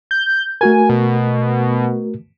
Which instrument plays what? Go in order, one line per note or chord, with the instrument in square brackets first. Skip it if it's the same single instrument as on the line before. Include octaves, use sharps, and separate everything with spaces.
[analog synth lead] G6
[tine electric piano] A3 F#4 A#4 [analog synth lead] G#5
[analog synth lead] B2